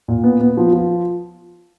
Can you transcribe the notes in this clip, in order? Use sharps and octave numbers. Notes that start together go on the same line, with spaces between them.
A#2
B3
B3
F3
F3